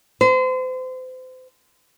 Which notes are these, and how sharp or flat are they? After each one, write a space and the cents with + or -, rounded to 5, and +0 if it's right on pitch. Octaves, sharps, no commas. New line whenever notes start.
C5 -35